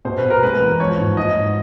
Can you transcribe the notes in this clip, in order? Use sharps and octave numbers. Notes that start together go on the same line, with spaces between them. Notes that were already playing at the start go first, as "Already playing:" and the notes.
B2 C5
B4
B2
A#4
G#3 B4
E2
F3 C#5
G#2
G#2 D#5
G#2